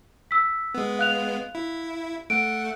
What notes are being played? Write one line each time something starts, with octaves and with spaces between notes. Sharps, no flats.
E6 B6
G#3 B3
F5 F#6 F7
E4
A3 F#5 D7